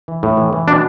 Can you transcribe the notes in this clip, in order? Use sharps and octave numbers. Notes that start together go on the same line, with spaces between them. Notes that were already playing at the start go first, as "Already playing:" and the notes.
E3
A2
E3
E3
B2 D4